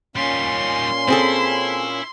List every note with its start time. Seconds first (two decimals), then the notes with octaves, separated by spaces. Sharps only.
0.16 A#2 G3 A#3 C#4 D#4 C6
1.08 C4 E4 G#4 A4